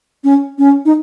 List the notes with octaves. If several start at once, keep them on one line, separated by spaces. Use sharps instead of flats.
C#4
C#4
D#4